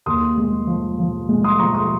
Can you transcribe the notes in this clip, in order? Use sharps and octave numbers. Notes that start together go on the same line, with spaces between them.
D#2 C6 D#6
G#3
F3
F3
G#3
C6 D#6
F3 A#5 C#6
C6 D#6